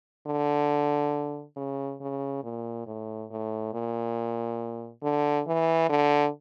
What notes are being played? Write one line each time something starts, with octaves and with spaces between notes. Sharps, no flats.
D3
C#3
C#3
A#2
A2
A2
A#2
D3
E3
D3